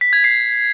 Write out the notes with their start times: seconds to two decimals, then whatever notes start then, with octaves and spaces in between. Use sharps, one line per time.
0.01 B6
0.13 G#6
0.24 C7